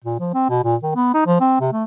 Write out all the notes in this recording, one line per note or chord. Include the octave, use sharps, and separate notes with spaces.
A#2
F3
C4
B2
A#2
D#3
B3
D#4
F3
C4
C3
A3